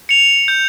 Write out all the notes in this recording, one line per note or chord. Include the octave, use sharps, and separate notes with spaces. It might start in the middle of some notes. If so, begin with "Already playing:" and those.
C#7 F7
G6